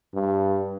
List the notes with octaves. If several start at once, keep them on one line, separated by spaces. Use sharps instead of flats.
G2